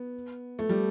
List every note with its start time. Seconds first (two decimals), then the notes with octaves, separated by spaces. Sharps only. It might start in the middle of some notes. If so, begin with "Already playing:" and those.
Already playing: B3
0.59 A3
0.69 G3